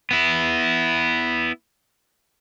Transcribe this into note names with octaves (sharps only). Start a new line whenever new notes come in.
B3 E4